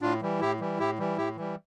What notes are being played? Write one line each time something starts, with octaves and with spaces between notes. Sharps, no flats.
A2 D4 F4
E3 G3
A2 E4 G4
E3 G3
A2 E4 G4
E3 G3
A2 E4 G4
E3 G3